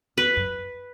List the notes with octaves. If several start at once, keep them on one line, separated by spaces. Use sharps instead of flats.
E2 B4
F#2